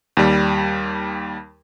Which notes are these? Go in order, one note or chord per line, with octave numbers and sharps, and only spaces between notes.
D#2 G3